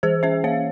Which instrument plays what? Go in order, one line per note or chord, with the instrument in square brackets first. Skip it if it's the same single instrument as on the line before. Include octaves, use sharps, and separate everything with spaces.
[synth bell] E3 G#4 C5
C#4 C5 E5
A#3 C#5 F5